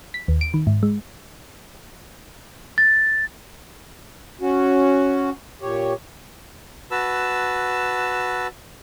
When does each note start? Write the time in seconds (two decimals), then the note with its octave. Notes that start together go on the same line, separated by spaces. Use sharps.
0.14 B6
0.28 D#2
0.41 D7
0.54 D#3
0.67 G#2
0.83 G#3
2.78 A6
4.41 C#4 F#4
5.62 A#2 G4 C#5
6.91 F#4 B4 A5 E6